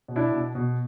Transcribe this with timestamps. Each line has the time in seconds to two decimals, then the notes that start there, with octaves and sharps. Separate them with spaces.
0.08 B2
0.16 D4 E4
0.32 B2
0.55 B2